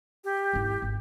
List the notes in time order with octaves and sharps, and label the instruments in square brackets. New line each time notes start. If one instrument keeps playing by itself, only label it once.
[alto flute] G4
[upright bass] G#1 E4
G#1